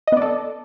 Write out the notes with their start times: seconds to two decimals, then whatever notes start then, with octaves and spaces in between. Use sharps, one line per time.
0.07 D#5
0.12 B3
0.17 D5
0.22 A4